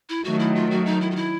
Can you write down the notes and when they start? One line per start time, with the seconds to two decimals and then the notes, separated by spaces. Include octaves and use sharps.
0.09 E4
0.24 D#3 F#3 A3 F#4
0.39 E4
0.55 F4
0.71 F#4
0.86 D#4
1.01 E4
1.11 F4
1.16 E4